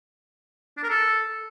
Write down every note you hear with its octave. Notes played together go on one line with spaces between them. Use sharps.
D4
A#4
A4